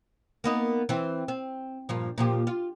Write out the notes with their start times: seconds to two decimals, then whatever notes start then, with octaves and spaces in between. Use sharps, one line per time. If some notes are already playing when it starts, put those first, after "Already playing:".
0.44 A#3 B3 D#4
0.89 E3 C4
1.28 C4
1.89 G2 A#2 F3
2.18 A#2 F3 G4
2.47 F4